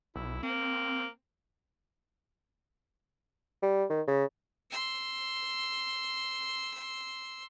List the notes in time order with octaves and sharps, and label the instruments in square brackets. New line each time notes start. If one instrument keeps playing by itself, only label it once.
[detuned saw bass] B1 [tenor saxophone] E4
[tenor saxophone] A#3 [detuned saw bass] C4
[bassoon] G3
D#3
C#3
[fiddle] C6 E6